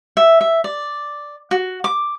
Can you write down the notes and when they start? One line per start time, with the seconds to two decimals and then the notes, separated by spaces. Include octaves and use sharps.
0.17 E5
0.41 E5
0.64 D5
1.51 F#4
1.84 D6